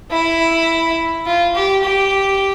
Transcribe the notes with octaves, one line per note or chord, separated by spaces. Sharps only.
E4
F4
G4
G4